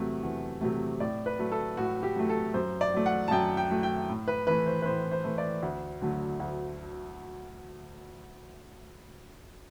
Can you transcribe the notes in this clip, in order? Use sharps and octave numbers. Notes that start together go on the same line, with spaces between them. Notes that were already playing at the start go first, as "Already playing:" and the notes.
Already playing: E2 C3 F#3 A3
E2
C3 F#3 A3
A2 D5
B4
F#3 A3
A4
A2 F#4
G4
F#3 A3
A4
F#2 C5
D5
F#3 A3
F#5
A5
F#2 G5
G5
F#3 A3
G5
A2
B4
E3 A3 B4
C5
B4
A2 C5
C5
E3 A3
D5
D2
D3 F#3 A3
D2